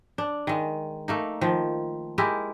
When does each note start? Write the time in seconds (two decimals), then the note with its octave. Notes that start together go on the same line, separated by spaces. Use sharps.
0.18 D4
0.47 D#3 G#3
1.08 A3 A#3 D#4
1.41 D#3 F3
2.18 G#3 E4 G4 A#4